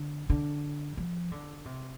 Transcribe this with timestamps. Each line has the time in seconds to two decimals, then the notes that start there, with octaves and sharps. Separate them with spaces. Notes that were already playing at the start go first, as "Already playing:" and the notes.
Already playing: D3
0.30 D3
0.97 F3
1.32 D3
1.65 C3